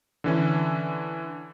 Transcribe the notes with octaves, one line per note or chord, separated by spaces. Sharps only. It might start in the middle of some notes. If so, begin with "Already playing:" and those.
D3 E3 C#4